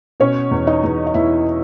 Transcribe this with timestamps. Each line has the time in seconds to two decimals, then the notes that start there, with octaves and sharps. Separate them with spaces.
0.20 B2 C#4 C#5
0.51 E2
0.67 D#4 D#5
0.83 E2
1.07 D#5
1.14 E2 E4 E5